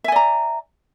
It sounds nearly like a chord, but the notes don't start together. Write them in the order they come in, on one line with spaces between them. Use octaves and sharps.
E5 G#5 D5 A#5